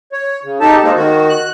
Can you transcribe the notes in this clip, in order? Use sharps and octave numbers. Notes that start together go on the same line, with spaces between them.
C#5
C#3
D#4 G4 A4 A5
G#3 A#3 C4 D#4
D#3 F#4
F#6